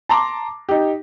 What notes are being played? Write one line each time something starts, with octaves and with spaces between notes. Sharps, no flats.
A5 A#5 C6 D6
D#4 G4